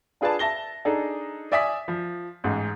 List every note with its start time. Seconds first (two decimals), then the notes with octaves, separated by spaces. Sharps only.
0.21 D4 F4 G#4 B4 D5 A5
0.39 E5 A5 A#6 G7
0.85 D4 D#4 G#4 A4
1.52 D5 E5 G#5 D#6 B6
1.88 F3
2.44 A1 G#2 G#4